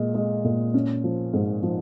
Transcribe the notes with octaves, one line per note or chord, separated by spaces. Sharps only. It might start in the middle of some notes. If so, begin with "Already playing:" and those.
Already playing: A#2 G#3
G#3
A#2
C#4
F3
G#2
F3